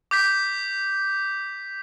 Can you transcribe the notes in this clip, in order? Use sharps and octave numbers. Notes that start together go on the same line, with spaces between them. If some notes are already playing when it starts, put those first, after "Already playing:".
D6 G6 B6